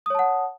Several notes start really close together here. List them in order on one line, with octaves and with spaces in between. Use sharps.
D#6 C#5 A5 F#5